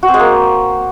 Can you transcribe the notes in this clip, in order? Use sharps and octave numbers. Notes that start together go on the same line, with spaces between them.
F#4
C4
G#3
A#3